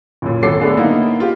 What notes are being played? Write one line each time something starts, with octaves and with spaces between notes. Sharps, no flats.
C#2 F#2 A#2
G#1 A2 F#3 A4 D6 C7
D3 A3 B3 D4 G#4 A4
A#3 B3 D#4 E4
F4 G4